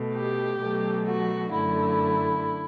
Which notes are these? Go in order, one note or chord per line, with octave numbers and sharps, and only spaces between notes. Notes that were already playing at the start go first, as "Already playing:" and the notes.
Already playing: B2 A3
G4
B2 F#3 A3
F#4
F#2 D3 A3 E4